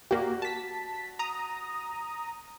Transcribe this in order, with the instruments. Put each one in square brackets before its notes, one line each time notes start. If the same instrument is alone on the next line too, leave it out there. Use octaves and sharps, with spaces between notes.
[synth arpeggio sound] A#3 G4 [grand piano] F#4 D5
[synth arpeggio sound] A5 B6
A#5 D#6